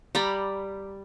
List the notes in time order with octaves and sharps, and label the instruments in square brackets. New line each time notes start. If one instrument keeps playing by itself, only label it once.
[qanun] G3 D5 A#5 B5